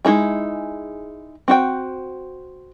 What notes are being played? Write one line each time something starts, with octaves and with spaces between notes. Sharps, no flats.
G#3 D#4 E4 G#4
C4 F#4 G5